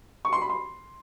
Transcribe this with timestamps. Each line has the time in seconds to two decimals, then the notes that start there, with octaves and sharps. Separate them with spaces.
0.25 C#6
0.33 C6
0.42 B5
0.50 C6